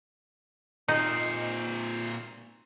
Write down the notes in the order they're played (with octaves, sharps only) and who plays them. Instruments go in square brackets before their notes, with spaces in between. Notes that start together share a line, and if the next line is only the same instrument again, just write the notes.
[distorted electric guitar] A#2 C4 [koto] D#4